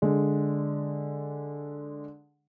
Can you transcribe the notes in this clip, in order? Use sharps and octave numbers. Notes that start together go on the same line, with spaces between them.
D3 G#3